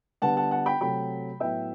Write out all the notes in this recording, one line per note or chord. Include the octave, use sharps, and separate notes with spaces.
D3 G3 B3 F#5 A5
F#5 A5
F#5 A5
G5 B5
C3 F#3 A3 G5 B5
A2 F#3 B3 E5 G5